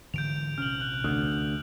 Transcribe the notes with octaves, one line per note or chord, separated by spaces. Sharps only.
G#2 D3 E3 G6 D7 F7
A#1 C3 C#4 F6 F#7
F#6
D2